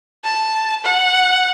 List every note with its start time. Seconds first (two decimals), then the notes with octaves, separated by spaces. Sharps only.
0.24 A5
0.84 F#5